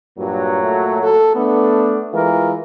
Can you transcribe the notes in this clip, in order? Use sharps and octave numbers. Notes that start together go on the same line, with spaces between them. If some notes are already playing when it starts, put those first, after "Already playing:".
G2 A#2 F#3
A3
A4
A3 B3 D4
E3 G#3 F4 A#4